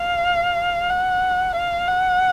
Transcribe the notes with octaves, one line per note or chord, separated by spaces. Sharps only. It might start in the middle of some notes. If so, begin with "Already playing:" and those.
Already playing: F5
F#5
F5
F#5